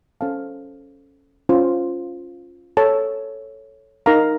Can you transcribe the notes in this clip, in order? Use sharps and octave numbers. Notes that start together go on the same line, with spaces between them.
C#4 A4 C5 F5 A5
C#4 F4 C5
A4 C#5 A5
D#4 A#4 F5 A#5